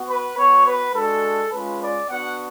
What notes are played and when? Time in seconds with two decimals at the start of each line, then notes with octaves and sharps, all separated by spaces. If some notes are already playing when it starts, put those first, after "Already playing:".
Already playing: B3 F#4
0.09 B4
0.37 B3 F#4 C#5
0.65 B4
0.94 G#3 D4 F#4 A4
1.52 G#3 C#4 F4 B4
1.81 D5
2.09 B3 D4 F#4 F#5